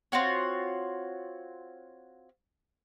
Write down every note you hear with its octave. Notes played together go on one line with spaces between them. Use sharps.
C4 F4 F#4 C#5